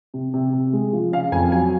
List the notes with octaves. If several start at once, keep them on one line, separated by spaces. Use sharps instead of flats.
C3
C3
C3
G#3
F3
C#3 F5
F2 G#5
F#3 G#5